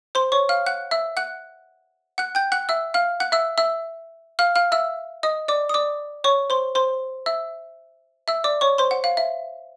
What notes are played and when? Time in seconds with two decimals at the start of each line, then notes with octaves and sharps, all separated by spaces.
0.15 C5 C6
0.32 C#5 C#6
0.49 F5 F6
0.66 F#5 F#6
0.91 E5 E6
1.17 F#5 F#6
2.18 F#5 F#6
2.35 G5 G6
2.52 F#5 F#6
2.69 E5 E6
2.94 F5 F6
3.20 F#5 F#6
3.32 E5 E6
3.58 E5 E6
4.39 F5 F6
4.56 F5 F6
4.72 E5 E6
5.23 D#5 D#6
5.48 D5 D6
5.69 D#6
5.74 D5 D6
6.24 C#5 C#6
6.50 C5 C6
6.75 C5 C6
7.26 E5 E6
8.28 E5 E6
8.44 D5 D6
8.61 C#5 C#6
8.78 C5 C6
8.91 F#5
9.04 F5
9.17 E5